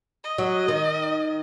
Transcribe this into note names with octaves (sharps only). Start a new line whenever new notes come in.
D#5
F#3
D#3